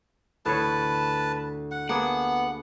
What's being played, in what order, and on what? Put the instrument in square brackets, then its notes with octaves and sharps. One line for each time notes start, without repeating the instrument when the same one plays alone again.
[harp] D2 [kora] A2 C#5 [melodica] B4 A5
[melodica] F#5
[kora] A#3 D4 G#4 [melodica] B3 [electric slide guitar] F#5